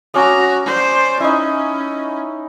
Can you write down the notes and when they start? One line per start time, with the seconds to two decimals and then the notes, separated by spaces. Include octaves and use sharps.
0.14 C#4 F#4 A#5 D6 D#6
0.66 C5 D5
1.20 C#4 D#4 E4